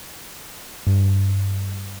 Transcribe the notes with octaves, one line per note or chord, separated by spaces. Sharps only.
G2